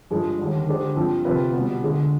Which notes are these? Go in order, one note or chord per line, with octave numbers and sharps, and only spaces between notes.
G2 F3 G#3
D#2 D3 G3
D3 G#3 D4 G4 C5
G2 F3 C4
C3 F3 C4 F4 B4
B2 G3 B3
D2 D3 G#3